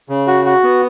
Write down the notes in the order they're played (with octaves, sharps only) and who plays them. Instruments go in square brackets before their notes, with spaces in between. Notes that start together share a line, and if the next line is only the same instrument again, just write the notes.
[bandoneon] C#3
F#4
F#4
B3